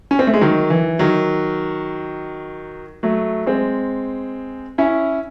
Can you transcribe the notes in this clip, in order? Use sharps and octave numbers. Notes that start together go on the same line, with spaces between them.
C#4
C4
A3
G#3
D#3 F#3
E3
D#3 F#3
F#3 A3
G#3 C4
C#4 E4